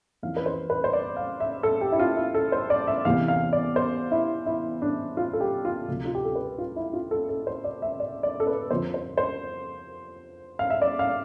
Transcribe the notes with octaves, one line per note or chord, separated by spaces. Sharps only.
F2 E3 F5
B4
C5
B4
C5
D5
F5
E5
A4
G4
E4
F4
E4
A4
C5
D5
E5
E2 C3 E3 F5
F5
D5
C5
E4
E4
D4
F4
A4
G4
F4
D2 C3 F3
F4
G4
A4
B4
F4
E4
F4
A4
A4
C5
D5
E5
D5
D5
A4
B4
F2 D3 F3 C5
C5
C5
F5
E5
D5
F5